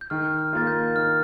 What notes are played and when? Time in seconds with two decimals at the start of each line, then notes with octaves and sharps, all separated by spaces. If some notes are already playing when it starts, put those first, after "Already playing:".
0.01 G6
0.10 D#3 F6
0.39 F6
0.53 A#3 F4 A6
0.67 G6
0.96 D#3 F6